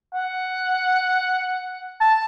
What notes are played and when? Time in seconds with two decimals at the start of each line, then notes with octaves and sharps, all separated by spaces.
0.14 F#5
2.01 A5